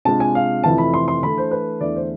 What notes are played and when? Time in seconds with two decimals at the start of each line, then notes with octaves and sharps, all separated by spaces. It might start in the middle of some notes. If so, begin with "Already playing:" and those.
0.05 C3 G#3 D4 F4 A5
0.20 G#5
0.35 F5
0.64 F2 C3 E3 A3 E4 A5
0.78 B5
0.94 C6
1.08 C6
1.23 E3 A3 D4 B5
1.38 C5
1.51 B4
1.81 E2 D3 A3 E4 D5
1.96 C5